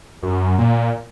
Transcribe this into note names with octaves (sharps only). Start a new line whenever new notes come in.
F#2
A#2